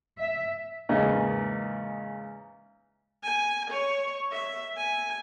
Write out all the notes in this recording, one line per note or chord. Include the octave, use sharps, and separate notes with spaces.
E5
E2 G#2 C#3 A#3 D#5
G#5
C#5
E5
G#5